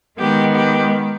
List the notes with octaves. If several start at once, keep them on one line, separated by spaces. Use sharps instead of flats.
D#3 G#3 B3 G4
G4